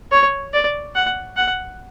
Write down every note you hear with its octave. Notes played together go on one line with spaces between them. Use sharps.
C#5
D5
F#5
F#5